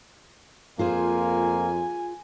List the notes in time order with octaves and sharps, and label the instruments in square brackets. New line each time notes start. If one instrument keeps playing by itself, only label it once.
[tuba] F2 [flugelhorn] A#3 [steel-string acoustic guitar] F4 G#4 C5 [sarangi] G#5